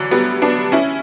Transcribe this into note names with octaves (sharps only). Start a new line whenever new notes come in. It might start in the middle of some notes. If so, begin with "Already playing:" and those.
Already playing: D3 E3 F#3
G3 B3
B3 D4
C#4 E4